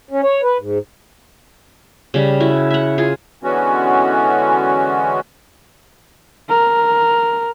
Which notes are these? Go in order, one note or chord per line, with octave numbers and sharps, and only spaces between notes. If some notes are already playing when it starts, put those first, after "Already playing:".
C#4
C#5
B4
G#2
C#3 G3
E4 F#4
E5 F#5
F4 G#4
D3 E3 G#3 B3 C#4 F#4
A#4